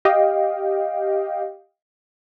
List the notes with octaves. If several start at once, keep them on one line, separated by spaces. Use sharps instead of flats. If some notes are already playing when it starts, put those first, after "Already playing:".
G4 D#5 F5 G5